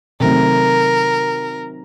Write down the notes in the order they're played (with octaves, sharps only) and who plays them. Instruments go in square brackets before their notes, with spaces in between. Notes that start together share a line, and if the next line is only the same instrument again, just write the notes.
[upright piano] C3 D#3 F#3 A3 C4 [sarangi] A#4